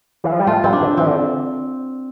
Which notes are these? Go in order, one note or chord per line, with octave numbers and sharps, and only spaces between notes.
E3
F3
G3
A3 F4
G3 C4
D4
D3
E3 C4
D3